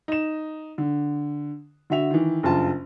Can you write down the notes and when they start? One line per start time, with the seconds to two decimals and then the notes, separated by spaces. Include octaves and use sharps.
0.08 D#4 E7
0.78 D3
1.90 D3 F#4 E5 F7
2.11 D#3 E3
2.43 F#1 G2 F4 A5